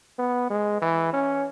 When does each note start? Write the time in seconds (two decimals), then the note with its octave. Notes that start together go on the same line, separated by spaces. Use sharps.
0.18 B3
0.50 G#3
0.82 E3
1.13 C#4